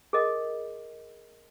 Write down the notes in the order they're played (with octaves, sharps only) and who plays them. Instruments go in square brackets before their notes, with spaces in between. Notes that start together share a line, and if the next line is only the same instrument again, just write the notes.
[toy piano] G#4 A#4 D#5